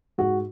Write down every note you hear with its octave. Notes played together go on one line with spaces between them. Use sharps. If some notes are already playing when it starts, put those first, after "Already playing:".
G#2 F#4